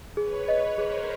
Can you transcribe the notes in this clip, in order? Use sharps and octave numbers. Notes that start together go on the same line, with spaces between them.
G#4 B4 C#5
D#5
G#4 A#4 C5